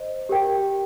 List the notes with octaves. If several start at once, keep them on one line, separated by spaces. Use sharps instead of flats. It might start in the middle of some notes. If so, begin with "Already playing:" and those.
Already playing: C5 D#5
G4 A#4 G5